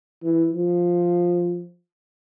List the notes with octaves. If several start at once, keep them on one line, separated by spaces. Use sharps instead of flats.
E3
F3